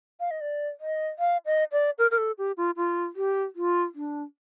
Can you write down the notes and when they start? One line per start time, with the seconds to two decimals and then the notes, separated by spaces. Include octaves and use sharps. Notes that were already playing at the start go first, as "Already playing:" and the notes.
0.20 F5
0.31 D#5
0.41 D5
0.80 D#5
1.19 F5
1.46 D#5
1.72 D5
1.98 A#4
2.11 A#4
2.18 A4
2.38 G4
2.57 F4
2.76 F4
3.16 G4
3.56 F4
3.95 D4